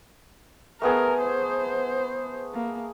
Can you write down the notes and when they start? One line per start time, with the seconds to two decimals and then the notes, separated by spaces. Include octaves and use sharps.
0.82 A3 B3 G#4 A#4
1.21 C5
2.54 A#3